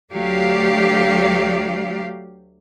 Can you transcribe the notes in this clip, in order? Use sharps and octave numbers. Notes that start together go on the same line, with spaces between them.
D2 F#3 A3 G4 D5 F5